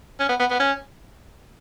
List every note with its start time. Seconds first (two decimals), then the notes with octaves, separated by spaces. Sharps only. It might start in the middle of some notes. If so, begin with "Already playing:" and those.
0.20 C#4
0.29 B3
0.40 B3
0.51 B3
0.60 C#4